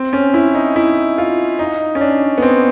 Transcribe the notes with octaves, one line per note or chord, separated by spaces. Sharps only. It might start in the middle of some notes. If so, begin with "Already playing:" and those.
Already playing: C4
C#4
E4
D#4
E4
F4
D#4
C#4
D4
B3
C4